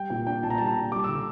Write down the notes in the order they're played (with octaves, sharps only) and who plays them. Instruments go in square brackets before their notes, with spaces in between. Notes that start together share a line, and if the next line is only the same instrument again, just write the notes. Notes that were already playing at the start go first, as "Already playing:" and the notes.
Already playing: [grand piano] G3 G5
A#2 G5
D4 G5
A#2 A5
A#5
G3 A5
A#2
G3 D6
E6
D3